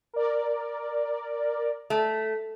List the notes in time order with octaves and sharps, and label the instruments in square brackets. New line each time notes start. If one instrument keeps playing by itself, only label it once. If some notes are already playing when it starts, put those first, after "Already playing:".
[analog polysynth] A#4 D5
[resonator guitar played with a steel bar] A3